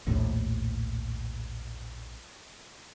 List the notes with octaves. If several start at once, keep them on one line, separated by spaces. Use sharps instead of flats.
A#1 D#2 A2